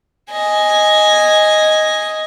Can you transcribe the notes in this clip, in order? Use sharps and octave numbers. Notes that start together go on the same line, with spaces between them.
D#5 G#5